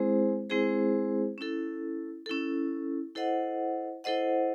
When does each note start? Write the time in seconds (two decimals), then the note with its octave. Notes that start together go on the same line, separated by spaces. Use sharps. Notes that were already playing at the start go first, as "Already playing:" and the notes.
Already playing: G#3 C4 E4 G#4 C5
0.50 G#3 C4 E4 G#4 C5
1.38 C#4 E4 A4
2.26 C#4 E4 A4
3.15 E4 A4 C5 D#5 F#5
4.04 E4 A4 C5 D#5 F#5